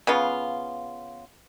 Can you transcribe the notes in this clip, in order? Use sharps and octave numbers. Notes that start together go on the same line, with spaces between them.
C#3 B3 F4